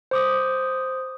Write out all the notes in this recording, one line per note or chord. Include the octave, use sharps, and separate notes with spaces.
C5 D6 D#6